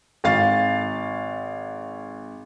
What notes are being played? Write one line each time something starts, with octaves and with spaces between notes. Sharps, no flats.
G#1 F5 A6